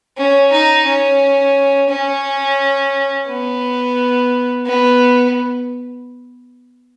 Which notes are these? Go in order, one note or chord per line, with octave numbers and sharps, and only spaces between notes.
C#4
D#4
C#4
C#4
B3
B3